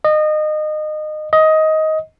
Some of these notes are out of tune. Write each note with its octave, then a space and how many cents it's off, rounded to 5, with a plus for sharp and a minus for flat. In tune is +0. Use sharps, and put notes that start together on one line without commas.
D#5 -25
D#5 +15